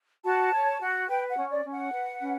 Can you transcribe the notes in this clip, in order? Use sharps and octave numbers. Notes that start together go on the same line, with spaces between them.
F#4 A5
C#5
F#4
B4 G5
F#5
C#4
D5
C#4
F#5
B4
C#4